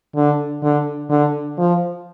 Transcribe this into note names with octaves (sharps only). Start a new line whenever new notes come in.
D3
D3
D3
F3